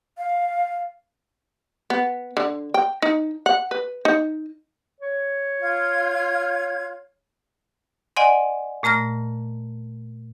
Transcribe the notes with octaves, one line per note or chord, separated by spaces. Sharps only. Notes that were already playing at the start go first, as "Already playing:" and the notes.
F5
B3
D3
G5
D#4
F#5
B4
D#4
C#5
F4 G#6
D5 D#5 F#5 G#5 C6
A#2 A3 A#5 F6 A#6